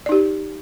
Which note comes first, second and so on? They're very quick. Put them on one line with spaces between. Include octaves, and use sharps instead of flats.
D5 D#4 G4